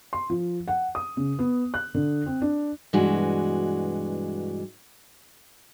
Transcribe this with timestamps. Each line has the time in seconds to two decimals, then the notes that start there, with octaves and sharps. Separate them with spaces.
0.13 C6
0.30 F3
0.68 F#5
0.95 D#6
1.17 C#3
1.39 B3
1.74 F#6
1.95 D3
2.26 C4
2.42 D4
2.93 G2 B2 E3 G#3 D4 F#4